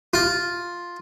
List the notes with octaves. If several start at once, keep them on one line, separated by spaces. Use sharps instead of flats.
F4